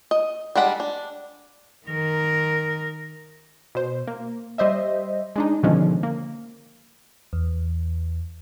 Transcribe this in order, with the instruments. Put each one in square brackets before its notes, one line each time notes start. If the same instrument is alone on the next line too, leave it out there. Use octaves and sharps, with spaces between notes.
[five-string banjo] D#5
G3 G#3 D4 F#5 B5
D4
[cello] D#3 A#4
[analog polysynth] B2 C5
A#3
G3 C5 D#5 E5
G#3 D4 D#4
B2 D3 D#3 F3 G#3 C#4
A#3
[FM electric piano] E2